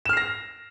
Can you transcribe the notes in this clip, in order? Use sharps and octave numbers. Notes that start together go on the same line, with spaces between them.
F6 A#6 C7 E7